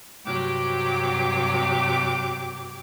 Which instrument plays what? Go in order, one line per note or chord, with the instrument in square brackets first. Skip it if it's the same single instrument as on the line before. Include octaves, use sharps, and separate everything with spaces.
[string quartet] G2 C3 F#3 G4 D6